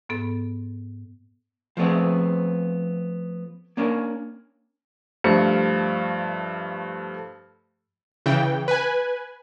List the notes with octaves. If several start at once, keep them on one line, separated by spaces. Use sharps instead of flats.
G#2 B3 A4
F3 G3 A3 B3 C4 G#4
A#3 C#4 D4 A#4
G2 F3 A3 C#7
C#3 E3 G5
B4 G#5